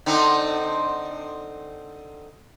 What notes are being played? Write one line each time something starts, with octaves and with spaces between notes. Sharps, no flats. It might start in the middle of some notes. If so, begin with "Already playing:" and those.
D3 C4 D#4